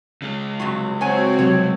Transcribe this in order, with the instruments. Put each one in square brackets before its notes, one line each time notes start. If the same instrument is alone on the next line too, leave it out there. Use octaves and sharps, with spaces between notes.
[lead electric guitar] C#3 G#3
[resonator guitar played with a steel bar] G2 C3 F#3 [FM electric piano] B5
[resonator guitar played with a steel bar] F#3 C#5 G#5 [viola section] C4 F#4
[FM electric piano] C3 F#3 G3 [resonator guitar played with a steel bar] C#5